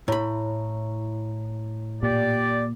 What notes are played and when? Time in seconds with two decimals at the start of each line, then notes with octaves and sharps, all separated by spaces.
0.08 A2 E4 C#5 A#5 B5
2.03 A#2 G4 D5